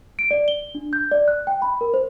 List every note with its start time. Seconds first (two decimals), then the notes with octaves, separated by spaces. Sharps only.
0.19 D7
0.31 D5
0.48 G7
0.75 D4
0.93 G6
1.11 D5
1.28 F#6
1.47 G5
1.62 B5
1.81 A#4
1.94 C5